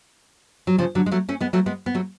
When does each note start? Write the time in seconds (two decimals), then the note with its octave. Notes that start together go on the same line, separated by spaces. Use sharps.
0.67 F#3
0.78 C#3 F3
0.95 D3 F#3
1.06 G#3
1.12 F#3 A3
1.29 A3 C#4
1.40 G#3 B3
1.53 F#3 A3
1.66 G#3 B3
1.86 B3
1.95 F#3 A3